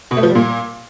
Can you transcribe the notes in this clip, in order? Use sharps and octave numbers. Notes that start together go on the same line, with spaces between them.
B2
A3
F3
G3
A#2